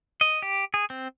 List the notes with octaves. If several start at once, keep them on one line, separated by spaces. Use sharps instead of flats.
D#5
G4
G#4
C4